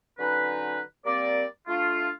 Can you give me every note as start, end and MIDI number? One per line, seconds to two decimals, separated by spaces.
0.19 0.80 50
0.19 0.80 54
0.19 0.80 61
0.19 0.80 63
0.19 0.80 71
1.05 1.43 55
1.05 1.43 58
1.05 1.43 60
1.05 1.43 70
1.05 1.43 74
1.67 2.10 57
1.67 2.10 62
1.67 2.10 65